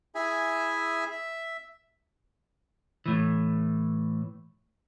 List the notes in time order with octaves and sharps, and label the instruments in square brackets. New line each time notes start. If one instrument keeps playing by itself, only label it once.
[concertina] E4 G#4 E5 G#5
E5
[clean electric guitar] A2 E3